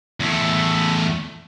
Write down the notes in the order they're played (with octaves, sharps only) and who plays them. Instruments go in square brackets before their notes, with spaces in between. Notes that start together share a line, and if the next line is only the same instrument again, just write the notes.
[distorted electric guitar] E2 A3